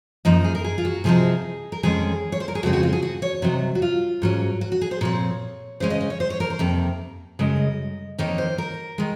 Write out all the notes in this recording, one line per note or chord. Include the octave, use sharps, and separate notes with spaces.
F#2 F3 A#3 D#4 D#5
G#4
A#4
G#4
F4
F#4
C3 F3 C4 D#4 G#4
A#4
F2 D#3 G#3 C#4 G#4
C#5
C5
A#4
G#4
F2 C#3 G#3 C4 F#4
F#4
F4
G#4
F#4
C#5
C3 D#3 F#3
F#4
F4
G#2 F#3 C#4
F#4
F#4
G#4
C5
A#2 F3 C4 C#5
C#3 G#3 C#4 C5
D#5
D#5
C#5
C5
C#5
A#4
C5
F2 C3 D#3 A#3
F#2 C#3 G#3 D#5
F2 D#3 A#3 D#4 C#5
C5
A#4
D#3 G#3